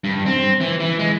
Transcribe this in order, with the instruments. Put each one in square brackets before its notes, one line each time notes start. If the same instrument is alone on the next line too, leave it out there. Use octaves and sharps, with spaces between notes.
[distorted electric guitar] G2
C4
E3
E3
G#3